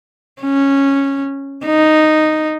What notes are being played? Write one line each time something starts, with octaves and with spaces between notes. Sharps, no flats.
C#4
D#4